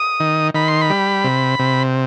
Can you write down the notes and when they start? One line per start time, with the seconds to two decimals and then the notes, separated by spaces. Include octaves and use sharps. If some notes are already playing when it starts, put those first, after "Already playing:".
Already playing: D#6
0.20 D#3
0.54 D#3 B5
0.68 C6
0.81 B5
0.90 G3
1.24 C3
1.59 C3